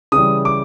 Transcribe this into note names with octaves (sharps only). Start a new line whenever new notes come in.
C#3 E3 G3 D#6
D6